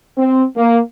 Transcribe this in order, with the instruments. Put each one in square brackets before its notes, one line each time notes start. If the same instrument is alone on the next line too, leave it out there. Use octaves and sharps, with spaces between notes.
[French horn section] C4
A#3